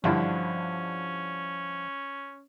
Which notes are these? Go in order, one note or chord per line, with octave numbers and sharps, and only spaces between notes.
G2 D3 F3 C#4 E4